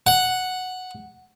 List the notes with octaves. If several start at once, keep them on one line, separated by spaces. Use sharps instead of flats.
F#5